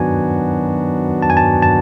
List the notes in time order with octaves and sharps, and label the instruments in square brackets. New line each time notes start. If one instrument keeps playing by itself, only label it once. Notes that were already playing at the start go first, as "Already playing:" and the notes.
Already playing: [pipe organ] D#3 F#3 B3 D4 F#4 [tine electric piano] G#5
[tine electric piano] A5
G#5
A5
A5